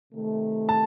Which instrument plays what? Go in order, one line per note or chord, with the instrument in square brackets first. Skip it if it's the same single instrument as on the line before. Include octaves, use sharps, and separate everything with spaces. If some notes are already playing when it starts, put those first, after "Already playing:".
[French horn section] C3 D#3 A3
[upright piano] A5